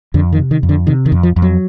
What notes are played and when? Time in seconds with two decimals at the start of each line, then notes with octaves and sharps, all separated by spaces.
0.14 F2 D3
0.33 D#3
0.39 C3
0.51 D#3
0.63 F2
0.69 D3
0.87 C3 D#3
1.06 D#3
1.12 F2
1.23 F3
1.36 F2
1.42 F#3